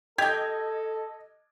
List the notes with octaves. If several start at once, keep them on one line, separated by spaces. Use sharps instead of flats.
G4 A4 D#5 G5 G#6